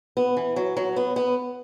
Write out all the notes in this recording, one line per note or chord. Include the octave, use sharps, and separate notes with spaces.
B3
E3
F#3
F#3
B3
B3